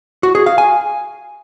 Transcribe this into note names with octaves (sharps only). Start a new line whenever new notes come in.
F#4
G#4
F5
G#5